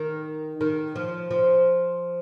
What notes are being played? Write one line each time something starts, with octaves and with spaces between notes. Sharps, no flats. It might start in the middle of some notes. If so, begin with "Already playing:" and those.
Already playing: D#3
D#3
F3
F3